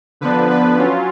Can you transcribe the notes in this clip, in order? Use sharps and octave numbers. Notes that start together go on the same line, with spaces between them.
D3 F3 B3 D4 B4
B4
F#3 C#4 F4